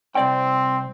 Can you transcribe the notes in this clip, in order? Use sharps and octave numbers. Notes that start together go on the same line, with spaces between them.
C2 C4 D5 G5